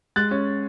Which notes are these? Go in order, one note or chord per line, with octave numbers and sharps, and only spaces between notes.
G#3 F#6 A6
C#4